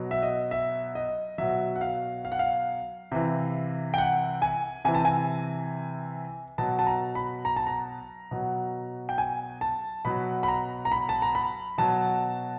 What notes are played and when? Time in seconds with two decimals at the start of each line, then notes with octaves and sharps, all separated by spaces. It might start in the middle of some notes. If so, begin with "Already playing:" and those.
Already playing: B2 F#3
0.11 E5
0.23 D#5
0.51 E5
0.95 D#5
1.38 B2 F#3 E5
1.76 F#5
1.81 F5
2.25 F5
2.32 F#5
2.39 F5
3.12 C3 E3
3.94 G5
3.98 F#5
4.42 G#5
4.85 C3 E3 G#5
4.95 A5
5.05 G#5
6.58 B2 F#3 A5
6.79 A5
6.87 A#5
7.15 B5
7.45 A#5
7.56 A5
7.67 A#5
8.31 B2 F#3
9.09 G5
9.18 G#5
9.61 A5
10.05 B2 F#3 B5
10.43 B5
10.48 A#5
10.85 A#5
10.92 B5
11.09 A5
11.22 A#5
11.35 B5
11.78 B2 F#3 A5